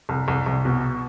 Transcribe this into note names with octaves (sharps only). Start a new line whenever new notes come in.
C2
C2
C2
B2